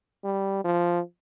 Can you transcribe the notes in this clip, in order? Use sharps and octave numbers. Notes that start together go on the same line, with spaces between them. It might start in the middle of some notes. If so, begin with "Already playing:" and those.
G3
F3